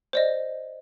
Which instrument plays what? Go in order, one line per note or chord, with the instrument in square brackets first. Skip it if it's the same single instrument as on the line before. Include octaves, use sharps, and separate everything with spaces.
[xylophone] C5 D5 D#5